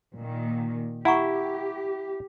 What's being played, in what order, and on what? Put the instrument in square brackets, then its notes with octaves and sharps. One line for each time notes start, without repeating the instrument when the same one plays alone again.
[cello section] A#2 D#3
[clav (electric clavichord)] E4 [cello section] G4 [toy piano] F#5 A#5 C#6